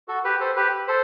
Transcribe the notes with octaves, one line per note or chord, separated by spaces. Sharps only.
F#4 A4
G4 B4
A4 C5
G4 B4
A4 C5